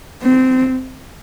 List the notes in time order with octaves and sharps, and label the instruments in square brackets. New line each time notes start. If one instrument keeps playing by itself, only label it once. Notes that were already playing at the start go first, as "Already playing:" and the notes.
[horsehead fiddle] C4